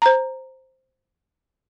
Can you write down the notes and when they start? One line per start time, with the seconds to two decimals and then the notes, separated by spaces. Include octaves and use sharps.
0.02 C5 A#5